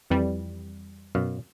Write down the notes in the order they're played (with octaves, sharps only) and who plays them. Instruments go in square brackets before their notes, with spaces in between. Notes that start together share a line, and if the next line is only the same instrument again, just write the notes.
[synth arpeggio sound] F2 E3 G3
[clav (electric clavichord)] F#2 B2 F5